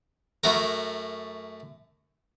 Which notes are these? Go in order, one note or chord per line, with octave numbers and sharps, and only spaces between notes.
F#2 A3 F#4 A#4